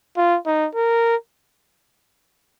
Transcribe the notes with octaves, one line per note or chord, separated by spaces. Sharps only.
F4
D#4
A#4